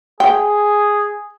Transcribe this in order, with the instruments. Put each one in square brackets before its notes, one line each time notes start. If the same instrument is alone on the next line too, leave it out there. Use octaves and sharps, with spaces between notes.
[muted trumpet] G#4 [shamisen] G5